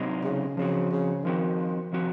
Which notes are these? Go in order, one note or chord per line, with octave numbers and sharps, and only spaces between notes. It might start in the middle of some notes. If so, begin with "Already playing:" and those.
Already playing: C3 F#3 C4 D#4
C#3
C#3 F3 C4 F#4
C#3
D#3 F3 C4 F#4
C3 F3 C4 F#4